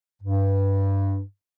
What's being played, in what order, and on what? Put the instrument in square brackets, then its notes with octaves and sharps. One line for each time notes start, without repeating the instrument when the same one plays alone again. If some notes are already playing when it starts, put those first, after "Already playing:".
[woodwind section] G2